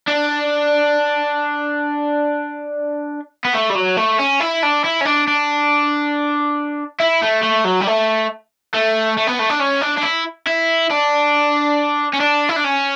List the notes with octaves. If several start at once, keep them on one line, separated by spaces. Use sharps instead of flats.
D4
B3
A3
G3
F#3
A3
C#4
E4
D4
E4
C#4
D4
D4
E4
A3
A3
F#3
G3
A3
A3
A3
B3
A3
D4
C#4
D4
D4
E4
E4
D4
C#4
D4
E4
D4
C#4